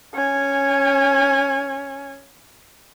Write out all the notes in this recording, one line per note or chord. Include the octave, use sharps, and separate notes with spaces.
C#4 G#5